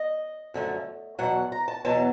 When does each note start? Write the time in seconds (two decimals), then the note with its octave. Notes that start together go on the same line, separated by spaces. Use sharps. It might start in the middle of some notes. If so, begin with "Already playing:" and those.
Already playing: D#5
0.54 F#2 D3 F3 A3
1.19 E2 B2 F#3 F#5
1.52 A#5
1.68 A5
1.85 E2 B2 F#3 A5